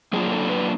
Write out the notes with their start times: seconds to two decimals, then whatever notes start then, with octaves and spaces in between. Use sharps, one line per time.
0.13 F#3 A#3 D4 F4 G#4
0.32 A4
0.49 B4